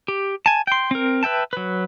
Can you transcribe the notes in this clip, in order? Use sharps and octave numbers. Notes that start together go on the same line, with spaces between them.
G4
G#5 A5
G5 C6
C4 A#4
B4 E5 G5 A5
F#3 B4